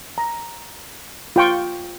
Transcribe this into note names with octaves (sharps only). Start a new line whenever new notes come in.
A#5
F4 G5 C#6